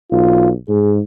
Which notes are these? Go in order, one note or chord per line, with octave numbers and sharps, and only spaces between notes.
B1 F4
G#2 G#4